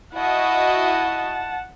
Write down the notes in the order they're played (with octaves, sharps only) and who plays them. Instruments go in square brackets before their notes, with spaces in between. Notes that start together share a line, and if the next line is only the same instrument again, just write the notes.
[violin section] E4 F#4 D#5 [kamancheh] F#5 A5